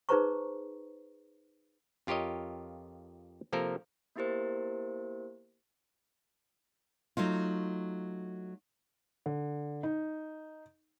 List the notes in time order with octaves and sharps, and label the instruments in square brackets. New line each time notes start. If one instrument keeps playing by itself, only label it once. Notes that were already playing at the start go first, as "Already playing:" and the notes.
[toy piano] D#4 G#4 B4 C5 A#5 C#6
[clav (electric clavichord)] F2 F4 G4 A#4 C#5 D#5
C3 F3 A#3 A4 A#4
[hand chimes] A#3 B3 E4 G4 A#4 C5
[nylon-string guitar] F#3 A3 D#4 F4
[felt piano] D3
D#4